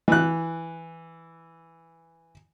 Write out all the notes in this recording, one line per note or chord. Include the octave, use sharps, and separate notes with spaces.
E3 F#6